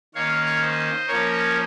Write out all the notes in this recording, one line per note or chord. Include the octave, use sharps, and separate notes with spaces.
D#3 A#3 C#4 C#5 F5
C5 D#5
F3 A#3 C#4 A#4 C#5